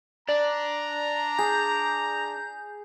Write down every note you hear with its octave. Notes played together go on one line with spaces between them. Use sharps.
D4 D5 A#5
G#4 G6